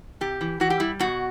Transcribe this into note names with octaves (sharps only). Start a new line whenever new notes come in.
C3 G4
E3
E3 F#4
G4
G3 E4
B2 F#4